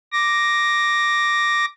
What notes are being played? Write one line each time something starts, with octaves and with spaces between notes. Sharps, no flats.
D6 A#6